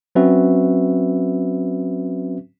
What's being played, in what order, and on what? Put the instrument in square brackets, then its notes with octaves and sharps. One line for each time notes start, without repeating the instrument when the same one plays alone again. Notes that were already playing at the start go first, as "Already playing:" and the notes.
[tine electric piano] F#3 C4 C#4 F#4 B4 E5